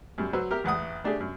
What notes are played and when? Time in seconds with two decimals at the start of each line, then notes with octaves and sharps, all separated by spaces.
0.18 F#2 G3
0.33 F#3 B4 C5 E6
0.51 G4 A#4 E5 F6
0.64 A1 E2 F#5 D#6
1.04 A3 D4 G4 G#4
1.20 F#2